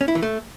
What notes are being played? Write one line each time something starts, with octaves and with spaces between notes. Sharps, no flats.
C#4
E4
E3
A3